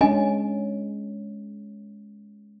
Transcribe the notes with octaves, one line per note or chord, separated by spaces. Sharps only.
G#3 C#4 D4 D#5 G#5